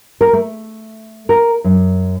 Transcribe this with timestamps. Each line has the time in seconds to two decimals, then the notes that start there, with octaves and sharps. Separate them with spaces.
0.21 A#4
0.33 A3
1.29 A#4
1.64 F#2